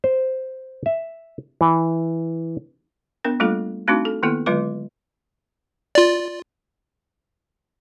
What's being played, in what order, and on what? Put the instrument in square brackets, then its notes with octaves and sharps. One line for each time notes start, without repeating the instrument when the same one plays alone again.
[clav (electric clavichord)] C5
E5
E3
[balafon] B3 D4 A#4
G3 A3 A#3 D4 F4 A4
A3 C4 D4 D#4 F#4
A4
D#3 A#3 B3 E4 A4
D3 F#3 G#3 F4 B4 D6
[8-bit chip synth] F4 D5